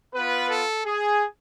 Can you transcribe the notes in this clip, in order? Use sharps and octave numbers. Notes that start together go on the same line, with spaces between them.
B3 F4 B4
A4
G#4